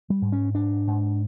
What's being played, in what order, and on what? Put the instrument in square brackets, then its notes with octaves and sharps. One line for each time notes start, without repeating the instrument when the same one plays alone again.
[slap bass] G3
G#2
C#4
G#2 D4
G#2